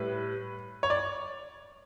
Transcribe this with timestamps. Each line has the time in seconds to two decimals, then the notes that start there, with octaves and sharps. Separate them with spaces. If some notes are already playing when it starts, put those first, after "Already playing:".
Already playing: A2 G3 B4
0.83 C#5
0.90 D5